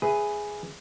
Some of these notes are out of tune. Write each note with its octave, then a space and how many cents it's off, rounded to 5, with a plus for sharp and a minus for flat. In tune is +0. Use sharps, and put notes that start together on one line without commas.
G#4 +0 B4 +10 E5 +0